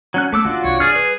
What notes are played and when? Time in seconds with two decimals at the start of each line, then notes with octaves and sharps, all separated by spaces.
0.14 F#3 C#4 F#6
0.32 A3 B3 D6 E6
0.45 C#3 D4 F4 F#4
0.64 C2 E3 C#5
0.80 G3 G#4 D5 F6
0.95 B4